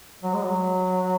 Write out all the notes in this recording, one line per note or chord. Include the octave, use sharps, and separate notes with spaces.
F#3
G#3
F#3